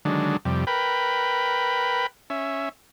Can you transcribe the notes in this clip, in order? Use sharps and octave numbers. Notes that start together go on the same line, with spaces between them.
D3 D#3 F#3 G#3 D4
F2 C3 G3
A#4 B4 G5 B5
C#4 E5